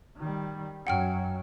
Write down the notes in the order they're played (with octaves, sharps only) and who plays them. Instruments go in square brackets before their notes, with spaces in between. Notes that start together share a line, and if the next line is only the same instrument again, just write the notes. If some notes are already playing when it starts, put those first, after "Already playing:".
[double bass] D#3 G3
[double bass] F#2 F#3 [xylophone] F#5 G5 F6